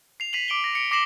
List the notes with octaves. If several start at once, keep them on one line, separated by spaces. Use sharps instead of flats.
C7 F7
B6 C7 D#7 F7 F#7
D6 D7 F#7 G7
A#6
C#7 D7
D6 A#6 C7 E7 F#7 G7